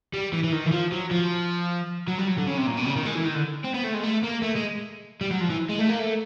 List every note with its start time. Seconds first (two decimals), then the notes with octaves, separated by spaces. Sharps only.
0.14 G3
0.33 E3
0.44 E3
0.52 D#3
0.66 E3
0.72 F3
0.92 F#3
1.11 F3
2.08 F#3
2.18 G3
2.28 F#3
2.38 D3
2.48 C#3
2.58 C3
2.67 A#2
2.78 B2
2.87 C#3
2.97 D#3
3.06 G#3
3.16 E3
3.26 D#3
3.35 D3
3.65 C4
3.74 B3
3.84 A3
3.94 G#3
4.03 A3
4.24 A#3
4.43 A3
4.56 G#3
5.21 G3
5.31 F#3
5.40 F3
5.50 E3
5.70 G#3
5.79 A3
5.89 A#3
5.99 A3